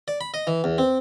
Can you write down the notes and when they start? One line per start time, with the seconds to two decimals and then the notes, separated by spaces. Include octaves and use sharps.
0.08 D5
0.21 B5
0.34 D#5
0.47 E3
0.64 E2
0.78 C4